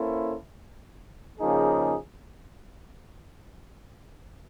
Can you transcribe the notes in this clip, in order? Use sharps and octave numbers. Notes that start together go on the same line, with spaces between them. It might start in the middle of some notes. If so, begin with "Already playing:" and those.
Already playing: A#3 C#4 E4 A4 C5
C#3 F3 A#3 D#4 G#4